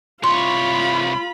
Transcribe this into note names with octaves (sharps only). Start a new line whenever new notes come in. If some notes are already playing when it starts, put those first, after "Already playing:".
C2 F4 C#5 B5 C6